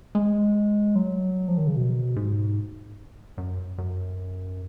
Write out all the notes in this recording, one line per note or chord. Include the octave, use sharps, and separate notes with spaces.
G#3
F#3
F3
D#3
C#3
B2
G#2
F#2
F#2